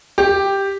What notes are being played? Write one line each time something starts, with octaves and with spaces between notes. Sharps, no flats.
G4